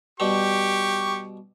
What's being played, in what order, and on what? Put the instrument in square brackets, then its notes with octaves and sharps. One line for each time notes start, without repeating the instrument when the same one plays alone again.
[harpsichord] B2 G3 C4 [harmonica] G4 C#6